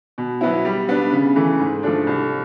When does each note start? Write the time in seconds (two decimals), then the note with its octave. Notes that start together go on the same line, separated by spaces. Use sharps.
0.18 B2
0.41 F#3 B3 E4
0.65 G3
0.89 B3 D4
1.12 C#3
1.36 E3 A3
1.59 G#2
1.83 F3 A3 D4
2.07 C2